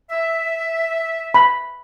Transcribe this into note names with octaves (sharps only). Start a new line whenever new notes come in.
E5
B5